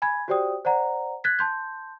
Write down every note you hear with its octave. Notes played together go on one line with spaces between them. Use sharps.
G#5 B5 G#6
F#4 G4 C5 D5 G5 D#6
C5 D5 F#5 A#5
F#6 G#6 A6 B6
A5 C6 G6